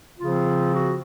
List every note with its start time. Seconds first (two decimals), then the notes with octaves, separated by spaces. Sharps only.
0.19 C#3 F3 C4 F4
0.75 F#4